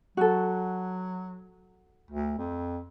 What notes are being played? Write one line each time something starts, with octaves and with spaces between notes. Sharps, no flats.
F#3 F#4 A4
D2
F2